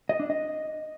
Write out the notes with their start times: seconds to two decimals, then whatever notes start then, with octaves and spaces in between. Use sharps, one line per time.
0.09 D#5
0.20 D4
0.30 D#5